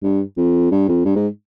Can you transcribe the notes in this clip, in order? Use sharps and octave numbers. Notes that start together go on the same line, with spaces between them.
G2
F2
G2
F2
G2
G#2